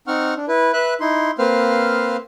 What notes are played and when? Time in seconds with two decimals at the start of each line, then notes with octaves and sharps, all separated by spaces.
0.07 C4 D#4 F#5 C#6 F6
0.37 D4
0.48 E4 B4
0.73 B4 E5 F#6
1.00 D#4 E4 C6
1.39 A#3 C4 B4 C5 F5 F6